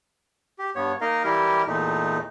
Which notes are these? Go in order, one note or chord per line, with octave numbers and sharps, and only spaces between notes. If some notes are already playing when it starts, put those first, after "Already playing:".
G4
G2 B3 C#5
A#3 D#4 A#4 D#5 F5
E3 G3 E4 G4 A#4
E2 A#2 A3 D#4